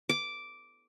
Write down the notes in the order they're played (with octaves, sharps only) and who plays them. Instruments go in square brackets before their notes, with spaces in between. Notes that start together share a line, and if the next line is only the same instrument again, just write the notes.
[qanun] D6